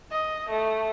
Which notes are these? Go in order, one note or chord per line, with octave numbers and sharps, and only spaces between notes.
D#5
A3